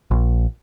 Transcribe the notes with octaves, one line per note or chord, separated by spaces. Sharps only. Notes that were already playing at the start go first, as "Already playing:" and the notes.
A#1